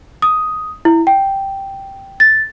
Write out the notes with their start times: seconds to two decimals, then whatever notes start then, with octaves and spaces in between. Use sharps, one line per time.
0.22 D#6
0.85 E4
1.07 G5
2.20 A6